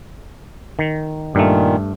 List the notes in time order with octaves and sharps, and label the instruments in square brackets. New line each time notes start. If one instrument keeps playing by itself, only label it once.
[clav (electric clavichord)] D#3
[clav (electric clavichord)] G2 A3 [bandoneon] A#2 D#3